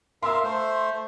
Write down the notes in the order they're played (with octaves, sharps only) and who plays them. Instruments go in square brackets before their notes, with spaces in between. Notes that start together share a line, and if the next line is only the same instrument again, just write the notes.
[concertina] A#4 E5 F5 [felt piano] C6 E6
[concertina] A3 C5